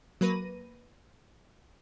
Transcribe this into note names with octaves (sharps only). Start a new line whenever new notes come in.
F#3 A#3 B4 A#6 D#7